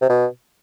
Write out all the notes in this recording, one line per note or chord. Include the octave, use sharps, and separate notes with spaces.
C3
B2